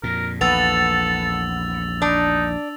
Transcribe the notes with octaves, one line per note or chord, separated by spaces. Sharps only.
F2 A#2 A#4
A#1 E2 B3 A4 E6 A6 F7
D4 D#4